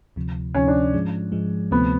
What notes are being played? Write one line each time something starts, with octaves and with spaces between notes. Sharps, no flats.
D2 C3 F3
D2 C3 F3 C#4
D4
G#2 F3 G#3
G#2 F3 G#3
D2 C3 F3 A3 B3 C4